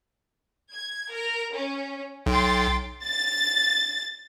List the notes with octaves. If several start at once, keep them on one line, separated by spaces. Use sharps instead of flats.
G#6
A#4
C#4
B1 G5 C6 A6
A6